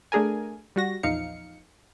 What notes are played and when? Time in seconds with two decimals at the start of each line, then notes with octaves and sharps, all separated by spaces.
0.12 A3 D4 G#4 A#4 G#5
0.76 G3 F#4 A#6
1.03 A#1 E2 F3 D#4 F5 C#7